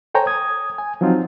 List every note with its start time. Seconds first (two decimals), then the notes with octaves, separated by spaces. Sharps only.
0.15 A4 C5 C#5 G5 G#5 A#5
0.27 D#6 G#6
0.78 G#5
1.01 F3 F#3 C4 D#4 F4